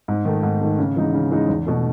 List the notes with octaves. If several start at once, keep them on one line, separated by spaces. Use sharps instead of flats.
G#2
D#3 A3
G#2
D#3 A3
C#3
E3 G#3 D#4
C#3
E3 G#3 D#4
E2
B2 A3